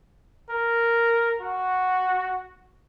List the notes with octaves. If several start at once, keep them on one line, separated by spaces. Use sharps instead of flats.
A#4
F#4